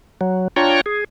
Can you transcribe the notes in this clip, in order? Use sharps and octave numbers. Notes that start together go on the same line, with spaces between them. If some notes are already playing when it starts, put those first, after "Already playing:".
F#3
D4 F4 C#5 G5 A#5 C#6
G#4